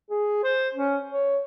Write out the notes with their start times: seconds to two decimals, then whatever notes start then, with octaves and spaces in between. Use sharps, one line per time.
0.10 G#4
0.43 C5
0.74 C#4
1.11 C#5